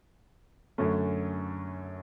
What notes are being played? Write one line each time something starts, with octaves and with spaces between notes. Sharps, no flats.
F#2 D3 A3 C#4